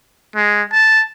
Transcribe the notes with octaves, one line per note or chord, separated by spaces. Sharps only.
G#3
A5